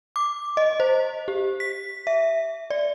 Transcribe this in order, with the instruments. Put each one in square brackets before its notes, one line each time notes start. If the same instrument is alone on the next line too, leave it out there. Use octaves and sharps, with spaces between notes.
[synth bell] D6
D#5
C5
G4
B6
E5
D5